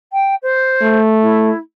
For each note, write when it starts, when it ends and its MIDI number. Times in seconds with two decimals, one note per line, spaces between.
0.13 0.35 79
0.43 0.99 72
0.82 1.51 57
1.22 1.59 64